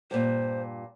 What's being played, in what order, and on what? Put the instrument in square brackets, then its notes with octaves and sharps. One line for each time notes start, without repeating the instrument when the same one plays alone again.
[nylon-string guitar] G2 A#2 [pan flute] C5